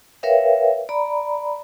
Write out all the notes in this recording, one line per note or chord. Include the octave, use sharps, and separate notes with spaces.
A#4 B4 C#5 E5 F5 G5
D5 A#5 B5